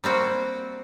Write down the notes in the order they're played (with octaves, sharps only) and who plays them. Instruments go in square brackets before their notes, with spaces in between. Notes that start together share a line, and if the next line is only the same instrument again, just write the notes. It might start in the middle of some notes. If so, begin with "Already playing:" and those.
[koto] G3 A#3 C4 F#4